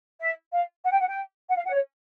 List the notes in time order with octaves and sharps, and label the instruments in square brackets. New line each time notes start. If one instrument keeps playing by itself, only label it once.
[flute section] E5
F5
F#5
G5
F#5
G5
F#5
F5
F#5
C#5